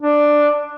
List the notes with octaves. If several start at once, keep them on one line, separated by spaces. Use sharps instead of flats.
D4